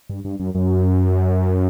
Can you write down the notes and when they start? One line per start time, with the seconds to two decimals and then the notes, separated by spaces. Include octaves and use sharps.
0.09 G2
0.25 G2
0.39 F#2
0.55 F#2